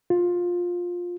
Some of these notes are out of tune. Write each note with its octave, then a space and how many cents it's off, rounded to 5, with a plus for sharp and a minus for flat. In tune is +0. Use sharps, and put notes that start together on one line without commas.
F4 +15